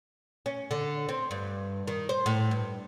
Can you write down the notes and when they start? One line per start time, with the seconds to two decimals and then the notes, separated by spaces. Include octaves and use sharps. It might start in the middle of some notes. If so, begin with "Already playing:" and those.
0.46 C#4
0.71 D3
1.09 C4
1.31 G2
1.88 D#3
2.09 C5
2.26 A2
2.51 G2